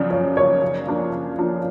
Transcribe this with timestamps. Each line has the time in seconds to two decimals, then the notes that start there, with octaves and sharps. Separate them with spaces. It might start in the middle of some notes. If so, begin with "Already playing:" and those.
Already playing: F#2 C#3 F3 D5
0.11 F#2 C#5
0.37 C#3 F3 C#5
0.62 C#3
0.87 F3 A#3 D4 F4
1.12 C#3
1.38 F3 A#3 D4 F4